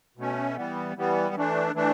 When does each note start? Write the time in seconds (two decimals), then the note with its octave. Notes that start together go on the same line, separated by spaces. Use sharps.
0.17 B2 A3 C#4
0.56 E3 G3 B3
0.96 E3 G3 B3
1.34 E3 A3 D4
1.74 E3 A3 D4